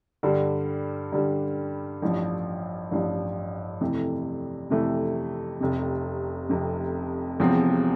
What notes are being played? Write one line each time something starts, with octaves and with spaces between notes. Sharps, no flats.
G2 D3 G3
G2 D3 G3
A1 G2 F3
A1 G2 F3
F2 C3 E3 A3
F2 C3 E3 A3
F1 F2 C3
F1 F2 C3
E1 E2 C3 F3 C4